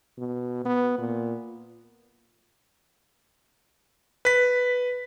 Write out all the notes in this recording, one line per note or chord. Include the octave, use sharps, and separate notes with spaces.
B2
B3
A#2
B4 B6